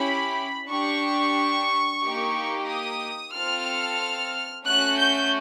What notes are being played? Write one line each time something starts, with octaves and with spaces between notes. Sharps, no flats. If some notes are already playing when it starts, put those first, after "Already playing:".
Already playing: C#4 E4 G4 B5
D4 G4 C#6
A#3 D#4 G4
D#6
C4 F4 A4 F6
A3 C#4 F#4 F#6
G6